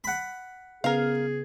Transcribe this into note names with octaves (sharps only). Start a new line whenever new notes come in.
F#5 B5
C#3 B3 G#4 A#4 F5